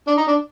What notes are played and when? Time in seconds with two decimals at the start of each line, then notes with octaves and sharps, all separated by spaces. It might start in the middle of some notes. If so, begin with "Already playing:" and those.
0.07 D4
0.17 D#4
0.27 D4